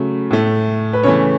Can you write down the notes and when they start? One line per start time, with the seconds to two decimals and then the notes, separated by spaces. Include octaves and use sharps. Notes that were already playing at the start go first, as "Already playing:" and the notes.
Already playing: C#3 F#3 A3
0.31 A2 A3
0.93 B4
1.03 C#3 E3 A3 C#5